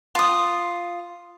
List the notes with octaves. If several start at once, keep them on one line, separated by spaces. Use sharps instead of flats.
F4 D#6